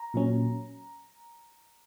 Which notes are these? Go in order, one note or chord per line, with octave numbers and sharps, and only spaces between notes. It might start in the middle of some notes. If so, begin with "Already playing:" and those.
Already playing: A#5
A#2 F#3 C#4